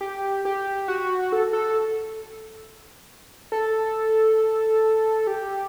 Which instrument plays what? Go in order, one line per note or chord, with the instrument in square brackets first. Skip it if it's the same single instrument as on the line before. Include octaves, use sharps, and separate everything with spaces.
[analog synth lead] G4
G4
F#4
A4
A4
A4
G4